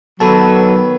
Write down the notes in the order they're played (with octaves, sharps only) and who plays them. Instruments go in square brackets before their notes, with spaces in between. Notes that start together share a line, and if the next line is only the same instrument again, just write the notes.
[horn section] D#3 F#3 [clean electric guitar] B3 B4 [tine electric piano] A4 A5